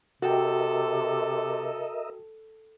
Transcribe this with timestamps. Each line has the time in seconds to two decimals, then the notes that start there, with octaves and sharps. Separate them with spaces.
0.22 C3 F#4 A4 A#4 D#5 E5 G5